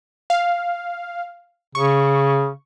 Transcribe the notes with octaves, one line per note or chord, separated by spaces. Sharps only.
F5
C#3 C#6